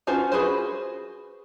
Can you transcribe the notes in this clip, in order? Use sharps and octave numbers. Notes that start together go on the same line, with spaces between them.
C#4 F4 F#4 C5
F#4 G#4 B4 C5